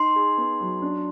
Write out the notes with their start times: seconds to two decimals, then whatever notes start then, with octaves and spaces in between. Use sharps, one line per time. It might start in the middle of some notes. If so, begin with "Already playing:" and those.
Already playing: D#4 C6
0.16 G#4
0.38 B3
0.60 F#3
0.82 D4